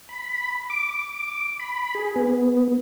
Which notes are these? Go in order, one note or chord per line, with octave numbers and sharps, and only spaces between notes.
B5
D6
B5
G#4
B3